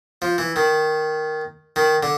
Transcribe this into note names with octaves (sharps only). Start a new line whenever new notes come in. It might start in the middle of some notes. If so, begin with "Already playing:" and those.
F3
E3
D#3
D#3
D3